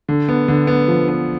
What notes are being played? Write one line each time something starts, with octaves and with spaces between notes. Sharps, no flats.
D3
B3
D3
B3
F3
B3